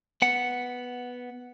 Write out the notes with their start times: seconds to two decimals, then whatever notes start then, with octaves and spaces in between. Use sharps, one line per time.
0.22 B3 F#5